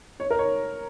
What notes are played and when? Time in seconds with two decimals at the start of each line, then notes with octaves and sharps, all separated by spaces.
0.20 C#5
0.30 A#4
0.39 C#5